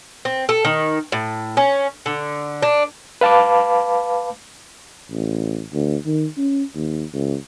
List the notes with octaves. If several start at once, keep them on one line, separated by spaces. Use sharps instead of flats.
C4
A4
D#3
A2
C#4
D3
D4
B4 F5 A5 B5 D6
A1
D2
D#3
C#4
D#2
C#2